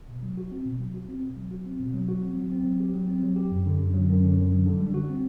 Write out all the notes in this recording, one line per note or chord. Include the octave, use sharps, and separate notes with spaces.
B2
F#3
F#4
C4
B2
F#3
F#4
C4
B2
F#3
F#4
C4
B2
F#3
F#4
C4
F#3
C4
F#3
G4
F#3
C4
F#3
G4
F#2
D3
F#2
F#3
F#2
D3
F#2
F#3
D3
G3
F#4
C4